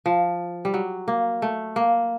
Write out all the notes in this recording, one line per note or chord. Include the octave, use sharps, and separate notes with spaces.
F3
G3
F#3
A#3
A3
A#3